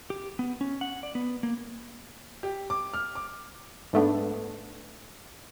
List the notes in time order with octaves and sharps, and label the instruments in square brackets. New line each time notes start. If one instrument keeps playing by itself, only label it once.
[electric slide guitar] G4
B3
C#4
F#5
D5
B3
A#3
[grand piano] G4
D6
F6
D6
[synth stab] G#2 A3 B3 D4